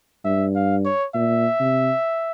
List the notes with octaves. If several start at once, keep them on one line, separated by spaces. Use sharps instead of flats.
G2 E5
F5
C#5
A#2 E5
C3